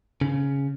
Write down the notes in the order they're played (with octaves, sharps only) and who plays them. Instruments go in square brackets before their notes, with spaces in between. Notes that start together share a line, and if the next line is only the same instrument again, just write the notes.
[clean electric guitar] C#3